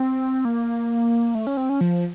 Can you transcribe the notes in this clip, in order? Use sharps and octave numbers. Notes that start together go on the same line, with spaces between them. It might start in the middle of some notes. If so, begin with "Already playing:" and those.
Already playing: C4
A#3
A3
C#4
C4
C#4
F3